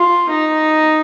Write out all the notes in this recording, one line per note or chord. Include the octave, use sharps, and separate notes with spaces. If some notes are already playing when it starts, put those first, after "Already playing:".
Already playing: F4
D#4